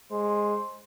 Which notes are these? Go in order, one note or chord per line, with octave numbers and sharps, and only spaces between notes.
G#3 C5